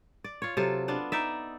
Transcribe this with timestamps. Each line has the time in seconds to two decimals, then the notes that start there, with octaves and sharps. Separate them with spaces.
0.24 D5
0.42 F4 C#5
0.57 C3 F#3 F4 A4
0.88 B3 D4 F4
1.12 D#4 D5 E5